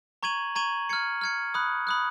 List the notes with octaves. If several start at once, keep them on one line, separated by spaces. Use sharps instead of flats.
A#5 C#6 G#6 D#7 F#7
A#5 C#6 G#6 D#7 F#7
F6 G#6 C#7
F6 G#6 C#7
B5 D#6 F#6
B5 D#6 F#6